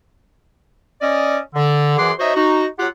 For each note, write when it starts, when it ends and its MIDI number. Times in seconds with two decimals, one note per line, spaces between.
1.02 1.39 61
1.02 1.39 74
1.02 1.39 75
1.55 1.98 50
1.98 2.11 42
1.98 2.11 52
1.98 2.11 68
1.98 2.11 78
1.98 2.11 84
1.98 2.11 86
2.19 2.33 63
2.19 2.33 66
2.19 2.33 72
2.19 2.33 73
2.19 2.33 75
2.19 2.33 76
2.35 2.66 63
2.35 2.66 66
2.79 2.87 54
2.79 2.87 65
2.79 2.87 67
2.79 2.87 78